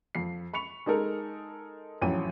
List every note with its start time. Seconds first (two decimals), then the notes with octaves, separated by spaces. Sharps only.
0.15 F2 C7
0.54 B5 C#6 C#7 F7
0.86 G#3 D#4 A4 A#4
2.02 A1 F2 F#3 G5 D#7